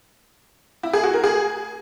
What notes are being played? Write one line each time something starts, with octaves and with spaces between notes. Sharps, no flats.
E4
G#4
F#4
A#4
G#4